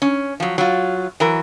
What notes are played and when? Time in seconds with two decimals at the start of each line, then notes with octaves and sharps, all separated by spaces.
0.02 C#4
0.40 F3 F#3
0.58 F#3 F4
1.20 E3 F#3 A#4